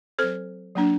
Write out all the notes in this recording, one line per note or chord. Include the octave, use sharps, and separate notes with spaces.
F#3 C4 A4 C5
F#3 A#3 D4